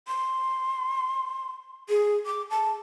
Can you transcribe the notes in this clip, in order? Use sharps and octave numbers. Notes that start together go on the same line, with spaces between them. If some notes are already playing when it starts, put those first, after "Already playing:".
C6
G#4
D6
A5